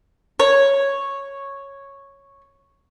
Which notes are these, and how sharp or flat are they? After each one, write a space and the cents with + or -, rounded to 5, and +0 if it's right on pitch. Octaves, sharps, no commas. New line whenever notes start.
C#5 -5